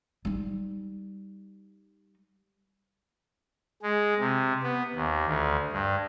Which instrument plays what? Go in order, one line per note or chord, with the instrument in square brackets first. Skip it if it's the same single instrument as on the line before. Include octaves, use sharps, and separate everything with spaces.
[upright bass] G3 D#4
[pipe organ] G#3
C3
B3
D#2
D2
G2